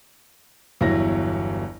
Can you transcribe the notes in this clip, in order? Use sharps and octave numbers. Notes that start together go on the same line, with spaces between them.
G1 E2 E3 F#3 E4 A#6